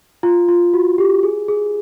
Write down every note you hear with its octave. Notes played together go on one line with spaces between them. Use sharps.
F4
F4
F#4
G4
G#4
G#4